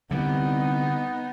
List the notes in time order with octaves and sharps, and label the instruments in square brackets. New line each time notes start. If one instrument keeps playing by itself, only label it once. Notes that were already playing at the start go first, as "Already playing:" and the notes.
[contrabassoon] C2 [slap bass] D3 G3 [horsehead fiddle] B3 D#4